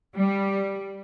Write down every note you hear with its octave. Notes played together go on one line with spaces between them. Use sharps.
G3